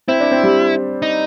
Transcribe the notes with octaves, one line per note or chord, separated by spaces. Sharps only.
C4 E4
D4
C4
G3
D#4